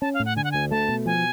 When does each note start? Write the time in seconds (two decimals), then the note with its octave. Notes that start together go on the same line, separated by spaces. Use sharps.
0.01 C#4 A5
0.14 F5
0.20 A2
0.25 F#5
0.36 D3 G#5
0.44 F#5
0.52 D2 G#5
0.71 A3 A5
0.89 B2
1.06 F3 G#5